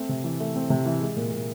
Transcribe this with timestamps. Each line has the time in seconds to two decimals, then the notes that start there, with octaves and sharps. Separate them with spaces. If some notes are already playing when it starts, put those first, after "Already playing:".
Already playing: A3 C4
0.09 C3
0.24 E3
0.40 A3
0.56 C4
0.70 C3
0.86 E3
1.01 G#3
1.16 A#2
1.32 A#2